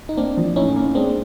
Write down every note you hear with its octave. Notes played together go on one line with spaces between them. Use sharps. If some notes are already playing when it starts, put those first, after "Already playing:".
D#4
A#3 C4 D4
F3
A2 C#4 D#4
A#3
G#3 C4 D4